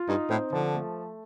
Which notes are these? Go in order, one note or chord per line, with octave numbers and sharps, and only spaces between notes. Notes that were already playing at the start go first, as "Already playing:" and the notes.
Already playing: F4
G2 D#4
A2 C4
D3 F3
A3